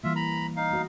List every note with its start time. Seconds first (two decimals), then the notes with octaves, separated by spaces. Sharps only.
0.04 E3 G3 A#3 F4 E5
0.16 A#5 B5
0.56 D#4 F5
0.71 A3 F#4 D#5